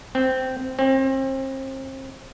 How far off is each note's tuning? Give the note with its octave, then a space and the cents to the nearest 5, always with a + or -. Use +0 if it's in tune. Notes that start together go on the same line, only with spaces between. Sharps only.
C4 -10
C4 +35